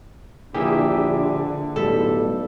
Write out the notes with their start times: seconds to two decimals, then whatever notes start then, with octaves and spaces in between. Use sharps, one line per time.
0.54 A#1 D3 E3 A#3 E4 G4 G#4 E5
1.76 B1 A2 G3 A4 E5